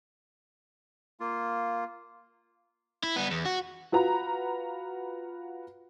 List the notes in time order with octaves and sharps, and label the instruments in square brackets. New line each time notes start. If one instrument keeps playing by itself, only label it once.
[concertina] A#3 F4
[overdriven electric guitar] E4
G3 B3
E2
F#4
[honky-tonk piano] F4 F#4 B4 A#5